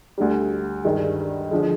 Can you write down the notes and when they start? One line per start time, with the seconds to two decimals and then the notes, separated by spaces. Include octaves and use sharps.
0.18 D2 D3 G3
0.85 G2 D#3 G#3
1.51 D3 F3 G#3